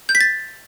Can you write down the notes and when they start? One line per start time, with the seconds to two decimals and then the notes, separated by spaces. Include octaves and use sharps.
0.09 G6
0.15 B6
0.21 A6